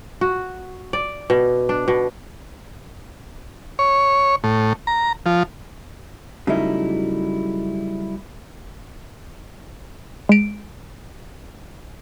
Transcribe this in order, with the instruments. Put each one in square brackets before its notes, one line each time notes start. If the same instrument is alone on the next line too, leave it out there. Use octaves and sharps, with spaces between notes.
[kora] F#4
D5
B2
D4
B2
[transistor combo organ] C#5
A2
A#5
F3
[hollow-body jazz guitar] C#3 F#3 G3 A3 D#4 E4
[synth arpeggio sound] G#3 D7